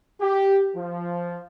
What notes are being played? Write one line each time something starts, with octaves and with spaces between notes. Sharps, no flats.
G4
F3